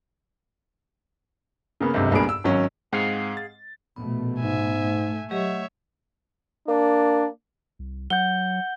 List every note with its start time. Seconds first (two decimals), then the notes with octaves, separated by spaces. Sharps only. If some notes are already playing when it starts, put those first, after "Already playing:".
1.81 C#3 A#3 B3
1.94 G1 C#2 F#2 C3
2.11 C2 G2 A#2 B3 G#4 D7
2.29 E6
2.44 G#1 F#3 C#4
2.93 G#2 G#3 C4 G#4 F5 F#5
3.37 A6
3.96 A#1 B2 A3 B3
4.40 G#2 E5 G#5
4.82 A3
5.31 F#3 G4 C#5 D#5 E5
6.68 A#3 D4
7.79 C2
8.10 F#3 F#5 G6 G7